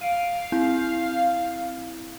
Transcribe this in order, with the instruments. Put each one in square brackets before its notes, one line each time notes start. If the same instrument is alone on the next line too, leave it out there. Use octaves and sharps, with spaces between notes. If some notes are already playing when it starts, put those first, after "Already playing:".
[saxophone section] F5 [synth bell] D7 D#7
[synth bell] C4 E4 G6